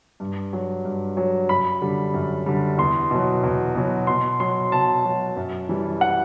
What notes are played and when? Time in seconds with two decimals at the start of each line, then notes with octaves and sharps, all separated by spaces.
0.20 G2
0.53 F#3
0.85 G2
1.17 F#3
1.49 F#2 B5
1.82 D3 G3
2.14 F#2
2.46 D3 G3
2.78 E2 C6
3.11 B2 F#3
3.43 E2
3.75 B2 F#3
4.07 B2 C6
4.40 F#3 C6
4.72 B2 A5
5.05 F#3
5.36 F#2
5.69 E3 G3
6.01 F#5